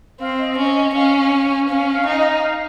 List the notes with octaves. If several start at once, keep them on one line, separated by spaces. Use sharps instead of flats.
C4 F5
D#5
C#4 D#5
D#5
C#4 F5
C#4 F5
F5
D#4 F5
D#5
F5